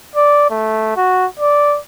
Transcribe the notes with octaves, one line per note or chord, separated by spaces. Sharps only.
D5
A3
F#4
D5